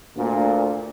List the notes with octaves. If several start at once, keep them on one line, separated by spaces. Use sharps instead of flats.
D2 A#2